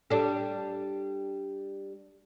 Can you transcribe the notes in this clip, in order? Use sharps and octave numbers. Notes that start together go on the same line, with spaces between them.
G3 D4 A4